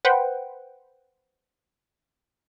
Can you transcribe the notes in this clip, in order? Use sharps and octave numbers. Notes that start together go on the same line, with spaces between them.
B4 C5 F#5 G5